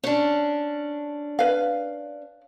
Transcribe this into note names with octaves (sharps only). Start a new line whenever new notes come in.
C#4 D4
B4 F5